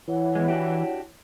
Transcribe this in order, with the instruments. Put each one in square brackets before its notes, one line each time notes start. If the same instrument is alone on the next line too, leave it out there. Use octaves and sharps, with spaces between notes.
[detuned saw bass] E3 [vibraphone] E4 C#5 F#5
[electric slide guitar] E2 G#3
D4 F#4 G4